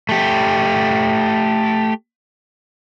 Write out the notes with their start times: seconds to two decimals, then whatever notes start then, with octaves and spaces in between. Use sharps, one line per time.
0.09 A3 G4